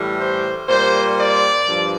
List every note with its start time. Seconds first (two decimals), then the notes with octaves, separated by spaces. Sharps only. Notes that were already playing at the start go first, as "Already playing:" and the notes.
Already playing: A2 E3 G3
0.19 C5
0.67 A#2 G3 C5
1.17 D5
1.66 G2 F3